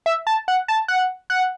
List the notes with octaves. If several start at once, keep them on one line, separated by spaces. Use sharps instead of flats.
E5
A5
F#5
A5
F#5
F#5